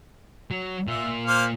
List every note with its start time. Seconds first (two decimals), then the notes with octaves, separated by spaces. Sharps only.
0.51 F#3
0.88 A#2 F4 E5
1.26 A#3 C5 F5